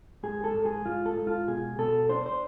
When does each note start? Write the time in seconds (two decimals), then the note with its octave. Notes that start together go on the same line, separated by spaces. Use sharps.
0.23 G#2 G#4
0.44 A4
0.54 G#2
0.65 G#4
0.85 G#2 F4
1.06 A4
1.16 G#2
1.27 F4
1.48 B2 G#4
1.79 B2 A4
2.09 D4 C5
2.26 C5